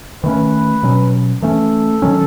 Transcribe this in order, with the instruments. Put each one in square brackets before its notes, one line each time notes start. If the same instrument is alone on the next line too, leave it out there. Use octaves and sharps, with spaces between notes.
[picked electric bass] D#3 A3 C#4 [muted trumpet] B4
[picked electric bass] B2 F#3 C#4
[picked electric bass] E3 A3 C#4 [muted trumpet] A4
[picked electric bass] D#3 F#3 C#4